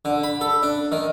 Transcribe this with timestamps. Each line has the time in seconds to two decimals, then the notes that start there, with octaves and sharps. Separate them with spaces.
0.05 D3
0.23 B5
0.41 A4
0.63 D4
0.92 D#3